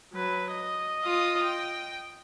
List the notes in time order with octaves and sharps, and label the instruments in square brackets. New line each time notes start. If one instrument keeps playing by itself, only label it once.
[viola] F#3 B4
D#5
[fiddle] F4 D#6
G5